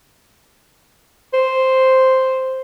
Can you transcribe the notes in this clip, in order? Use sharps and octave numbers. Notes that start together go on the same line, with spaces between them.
C5